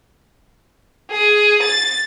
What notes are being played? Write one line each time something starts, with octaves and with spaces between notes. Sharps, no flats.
G#4
A6